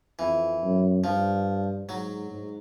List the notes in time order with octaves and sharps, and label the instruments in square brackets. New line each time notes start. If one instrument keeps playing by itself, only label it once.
[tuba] F2 [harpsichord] E3
[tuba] F#2
[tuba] G2 [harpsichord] F3
[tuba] G#2 [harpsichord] F#3
[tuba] G#2